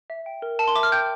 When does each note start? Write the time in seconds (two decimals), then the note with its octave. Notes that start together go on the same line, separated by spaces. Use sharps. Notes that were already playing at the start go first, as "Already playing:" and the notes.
0.10 E5
0.26 G5
0.42 A#4
0.59 A#4 A5
0.68 C6
0.75 E5 D6
0.83 F6
0.92 G5 G6